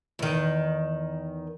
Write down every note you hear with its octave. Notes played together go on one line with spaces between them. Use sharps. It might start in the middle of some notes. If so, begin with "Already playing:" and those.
E2 D#3